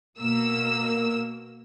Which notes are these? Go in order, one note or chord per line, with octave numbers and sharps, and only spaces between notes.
B2 A#3 E6